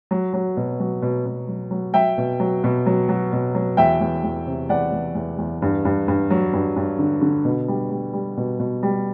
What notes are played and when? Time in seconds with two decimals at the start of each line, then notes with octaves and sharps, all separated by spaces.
0.11 F#3
0.33 F#3
0.57 B2
0.80 F#3
1.02 B2
1.26 B2
1.48 F#3
1.71 F#3
1.94 F#3 E5 G5
2.18 B2
2.40 F#3
2.64 B2
2.86 F#3
3.09 F#3
3.33 B2
3.55 F#3
3.77 E2 E5 G5
4.01 E2
4.24 E2
4.47 C3
4.69 E2 D5 F#5
4.92 E2
5.15 E2
5.38 E2
5.62 G2
5.85 G2
6.08 G2
6.30 F#3
6.53 G2
6.76 G2
6.99 D3
7.22 D3
7.45 B2
7.68 G3
7.91 G3
8.13 G3
8.37 B2
8.60 B2
8.83 G3